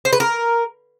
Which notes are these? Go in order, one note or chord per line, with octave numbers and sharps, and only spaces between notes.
C5
B4
A#4